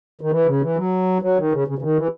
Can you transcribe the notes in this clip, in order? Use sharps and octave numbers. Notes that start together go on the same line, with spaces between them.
D#3
E3
C#3
E3
F#3
F#3
D#3
C#3
C#3
C#3
D#3
E3